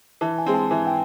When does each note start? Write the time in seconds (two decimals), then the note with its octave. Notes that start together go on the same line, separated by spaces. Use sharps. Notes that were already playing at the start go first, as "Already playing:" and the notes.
0.21 E3 A5
0.38 G#5
0.46 G#3 C4
0.54 A5
0.71 E3 G#5
0.87 G5